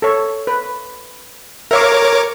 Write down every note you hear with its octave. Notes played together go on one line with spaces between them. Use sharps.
A4 C#5
B4
A#4 C#5 E5 F5 D6